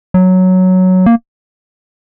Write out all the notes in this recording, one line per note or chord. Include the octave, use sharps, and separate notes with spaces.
F#3
A#3